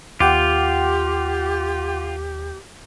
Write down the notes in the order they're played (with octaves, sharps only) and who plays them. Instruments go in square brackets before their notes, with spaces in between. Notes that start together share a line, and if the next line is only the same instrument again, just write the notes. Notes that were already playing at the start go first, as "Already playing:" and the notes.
[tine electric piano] D#2 [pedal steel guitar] F4 [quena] G4 [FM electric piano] F#5 G5 D6